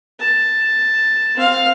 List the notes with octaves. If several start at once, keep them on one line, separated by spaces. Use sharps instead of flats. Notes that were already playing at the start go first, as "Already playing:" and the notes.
A5
C4 F5